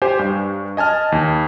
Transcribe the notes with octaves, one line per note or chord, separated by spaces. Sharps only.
G4 C5 G#5
G2
D#5 G#5 A5 F6
D#2